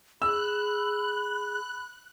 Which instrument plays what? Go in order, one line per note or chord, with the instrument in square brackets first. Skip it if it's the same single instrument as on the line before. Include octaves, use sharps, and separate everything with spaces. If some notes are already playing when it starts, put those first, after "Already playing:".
[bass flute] G#4 [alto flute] B5 [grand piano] E6 [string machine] F#6